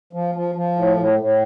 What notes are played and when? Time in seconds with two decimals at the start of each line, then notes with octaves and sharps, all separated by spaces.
0.13 F3
0.35 F3
0.55 F3
0.76 A2
0.97 A2
1.19 A2